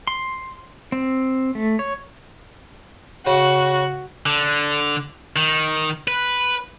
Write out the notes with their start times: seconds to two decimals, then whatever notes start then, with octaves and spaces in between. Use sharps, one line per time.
0.07 C6
0.92 C4
1.55 A3
1.79 C#5
3.27 C#3 F#4
4.26 D3
5.36 D#3
6.08 B4